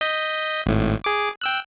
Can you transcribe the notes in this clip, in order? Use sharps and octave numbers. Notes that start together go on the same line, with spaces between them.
D#5 G6 B6
G#1 A2
G#4 D6
G5 E6 F#6